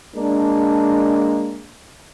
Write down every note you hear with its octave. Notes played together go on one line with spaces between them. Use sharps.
G#3 A#3 D4